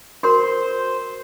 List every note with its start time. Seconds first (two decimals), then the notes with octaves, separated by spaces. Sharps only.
0.23 F#4 A#4 C5 C6